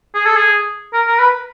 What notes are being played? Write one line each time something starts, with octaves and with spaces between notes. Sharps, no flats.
G#4
A4
G#4
A#4
A#4
B4